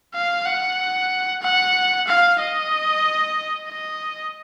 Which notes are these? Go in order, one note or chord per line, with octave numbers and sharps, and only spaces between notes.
F5
F#5
F#5
F5
D#5
D#5